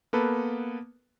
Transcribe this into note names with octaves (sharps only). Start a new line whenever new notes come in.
A#3 B3 A4 B4